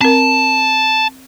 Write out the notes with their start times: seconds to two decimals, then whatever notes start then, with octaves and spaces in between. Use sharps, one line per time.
0.01 C4 A#4 A5